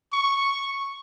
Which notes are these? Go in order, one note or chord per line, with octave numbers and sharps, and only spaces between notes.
C#6